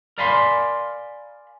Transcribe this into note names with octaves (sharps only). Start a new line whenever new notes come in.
A#4 D5 F5 G#5 B5 C6